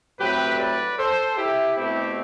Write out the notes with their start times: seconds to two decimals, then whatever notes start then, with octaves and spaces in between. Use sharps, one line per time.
0.18 A2 F#3 C4 G4 B4
0.58 B4 D5
0.97 A4 C5
1.36 E4 G4
1.76 B2 A3 C4 E4 G4